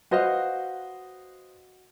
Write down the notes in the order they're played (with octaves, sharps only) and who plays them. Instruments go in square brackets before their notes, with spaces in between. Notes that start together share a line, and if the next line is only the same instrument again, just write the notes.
[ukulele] F#4 F5 [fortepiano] B4 C5 D#5